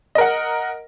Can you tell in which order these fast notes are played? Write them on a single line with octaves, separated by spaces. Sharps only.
D#5 A#4 F#5